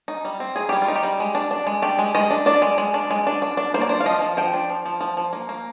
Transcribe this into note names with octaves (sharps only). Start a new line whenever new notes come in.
D#4
G3
C4
D#4 G#4
G3 G4
F4
D#4
G4
G3
G#3
D4
D4
G#3
D4 G4
G#3
G#3 D#5
D4
D4 D5
G#3
G#3
D4
G#3
D4
D4
D4
A#3 C5
D5
D4 C5
F5
F3 D#5
F3
F3 G5
D4
F3
F3
F3
F3
A#3
A#3